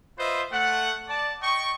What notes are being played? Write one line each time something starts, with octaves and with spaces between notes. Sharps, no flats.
F4 B4 C5 D#5 E5
A3 F#5
D5 A5
D#5 G5 C#6